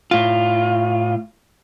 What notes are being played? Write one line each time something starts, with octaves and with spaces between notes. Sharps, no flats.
A2 F4